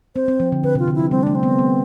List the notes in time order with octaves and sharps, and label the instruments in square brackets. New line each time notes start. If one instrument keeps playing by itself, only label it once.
[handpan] C4 [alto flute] C5
[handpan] C4
F3
D3
[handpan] D3 [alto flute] B4
[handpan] C3
[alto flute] F4
[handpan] D3
[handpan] F3 [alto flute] E4
[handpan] G3 [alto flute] C4
[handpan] A3 [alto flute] D4
[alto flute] C4
[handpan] B3
B3